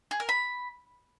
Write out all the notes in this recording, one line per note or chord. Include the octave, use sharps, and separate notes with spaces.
G#4
A#4
B5